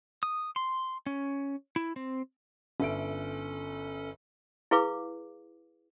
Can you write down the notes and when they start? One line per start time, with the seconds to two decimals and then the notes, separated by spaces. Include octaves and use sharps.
0.23 D#6
0.56 C6
1.06 C#4
1.76 E4
1.96 C4
2.80 G1 C#4 A4 E5 D7
4.71 E4 G#4 B4 F5 D6